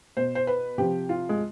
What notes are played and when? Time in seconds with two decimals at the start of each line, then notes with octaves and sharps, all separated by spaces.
0.17 B2 C5
0.35 C5
0.47 B4
0.78 C3 F3 G4
1.09 F4
1.29 G#3